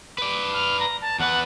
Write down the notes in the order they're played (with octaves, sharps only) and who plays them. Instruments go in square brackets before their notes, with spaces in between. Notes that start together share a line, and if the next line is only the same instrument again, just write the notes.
[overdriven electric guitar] B4 D5
[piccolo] F6
A#5
A5
[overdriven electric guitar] E2 B4 [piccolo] F#5